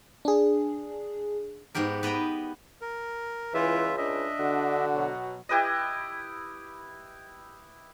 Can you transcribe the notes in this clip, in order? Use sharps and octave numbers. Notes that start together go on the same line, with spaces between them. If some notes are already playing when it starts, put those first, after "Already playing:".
D4 G#4
G#2 B3 G4 A#4
B3 B4 D#5 G5 A#5
A#4
C#2 E3 F4 E5
D4 D#5 E5
D3 F#4
B2 F#3
E4 G4 B4 D#5